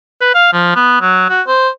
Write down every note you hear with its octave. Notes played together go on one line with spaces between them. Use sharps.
B4
F5
F3
B3
F#3
F#4
C5